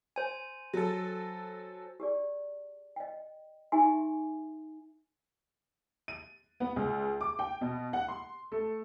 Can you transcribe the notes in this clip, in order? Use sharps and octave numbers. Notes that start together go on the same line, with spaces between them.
C5 G#5
F#3 A4
G4 G#4 D5
D#5 G5
D#4 G4 E5 G#5 C6
D#7
B3
C#2
D6
G5
B2
F#5
C6
A3